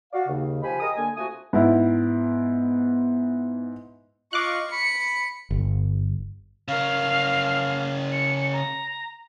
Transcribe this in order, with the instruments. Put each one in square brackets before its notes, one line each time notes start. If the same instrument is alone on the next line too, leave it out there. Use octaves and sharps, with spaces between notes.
[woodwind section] F#4 D5 F5
D#2 C#3
F3 G4 C5 G#5 B5
G4 G#4 A#4 D#5 D#6
D3 A#3 G#5
C3 A3 F4 F#4 G#5 D#6
[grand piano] G#2 E4 [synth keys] B3
[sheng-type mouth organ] F4 D#5 F5 [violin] C#6 [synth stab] D6 F#6
[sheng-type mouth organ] B5 [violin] C#7
[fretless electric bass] G1
[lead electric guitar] C#3 A#4 [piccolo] F5
[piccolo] C#7
A#5